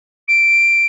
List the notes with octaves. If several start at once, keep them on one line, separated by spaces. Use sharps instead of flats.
D7